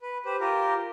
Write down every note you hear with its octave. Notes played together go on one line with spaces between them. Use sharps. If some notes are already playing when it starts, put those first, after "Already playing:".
B4
G4 B4 C5
F4 G4 A#4